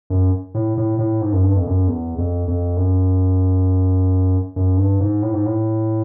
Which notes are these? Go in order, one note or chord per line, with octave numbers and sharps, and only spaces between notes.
F#2
A2
A2
A2
G#2
F#2
G2
F2
F#2
E2
F2
F2
F#2
F#2
G2
G#2
A2
G#2
A2